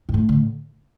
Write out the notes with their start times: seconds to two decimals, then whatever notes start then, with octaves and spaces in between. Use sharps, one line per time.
0.09 G#2
0.14 A2
0.29 D3